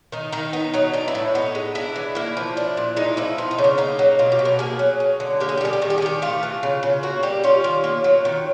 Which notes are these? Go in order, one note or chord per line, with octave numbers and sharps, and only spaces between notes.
D#3 D#4
D#3 D#4
B3 D#4
F#3 D#4
D4 D#4
E4
A2
B3 D#4
G#3
D4 E4
E3
A#3 E4
F3
D4
A#2
G#3 D#4
F3 E4
B3 F4
D#4
C#3
D4
A#3 D#4
F#3
B2 F4
G4
B2
A#4
A#3 G#4
F#3
C#4
D3
A#3 G4
G#4
G4
G3 G#4
G4
D#3 G#4
G4
G#4
D#3 G4
A3 F4
E3
C#3
C#3
A#3 F#4
G3 G4
C#4 F4
D#3
A#3
F#3
D#3